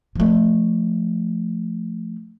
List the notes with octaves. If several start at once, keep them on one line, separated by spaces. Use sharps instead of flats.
F3 A3